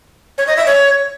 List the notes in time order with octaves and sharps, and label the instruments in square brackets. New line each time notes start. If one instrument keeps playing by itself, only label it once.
[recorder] C#5
D#5
E5
C#5